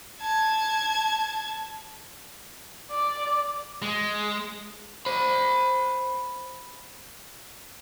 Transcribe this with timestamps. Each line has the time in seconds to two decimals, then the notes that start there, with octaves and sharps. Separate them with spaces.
0.21 A5 G#6
2.91 D5
3.82 G#3
5.06 C5 B5